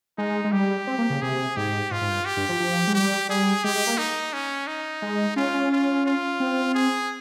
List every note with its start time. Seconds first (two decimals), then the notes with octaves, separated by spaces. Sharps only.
0.18 G#3 D#4
0.44 G#3
0.52 G3 G4
0.87 C4
0.98 A#3
1.10 C#3
1.22 C3 G#4
1.56 G#2 G4
1.91 G#2 F4
2.01 G#2
2.08 G2
2.25 G4
2.37 G2
2.49 F3
2.60 F3
2.87 G#3
2.95 G3 G4
3.29 G3 G#4
3.64 G#3 G4
3.75 G#3
3.87 A#3
3.98 D#4
4.33 C#4
4.67 D#4
5.02 G#3
5.36 C#4 F4
5.54 C#4
5.72 F4
6.06 F4
6.40 C4
6.75 G#4